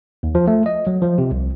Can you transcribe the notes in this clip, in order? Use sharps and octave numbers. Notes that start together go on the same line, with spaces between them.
D#2
F3
A3
D#5
F#3
F3
C3
C2